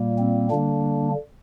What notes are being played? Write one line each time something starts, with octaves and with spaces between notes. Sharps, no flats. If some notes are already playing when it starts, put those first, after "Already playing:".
Already playing: A#2 G3 A#3
C4
D3 G3 A#3 D4